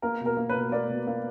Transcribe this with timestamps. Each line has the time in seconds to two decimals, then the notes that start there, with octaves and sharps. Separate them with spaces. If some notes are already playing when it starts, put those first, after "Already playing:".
0.02 A#3 A#4
0.21 B2
0.26 A#4
0.37 A#3
0.49 B4
0.56 B2
0.72 A#3 A#4 D5
0.89 B2
1.07 A#3